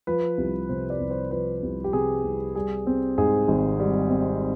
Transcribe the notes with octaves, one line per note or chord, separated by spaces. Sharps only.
F3 B4
C2
C3 C5
D5
C2
C5
F3 B4
C2
G4
C3 G#4
C2
G3 G#4
C4
G#2 G#4
G#1
G3
C4